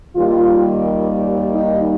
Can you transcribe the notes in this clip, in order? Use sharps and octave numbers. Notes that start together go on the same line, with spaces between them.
D#2 D#3 G3 F4
D#4